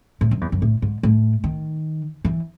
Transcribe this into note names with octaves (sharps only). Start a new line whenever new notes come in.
A2
F#2
E2
F#2
A2
G#2
A2
D#3
E3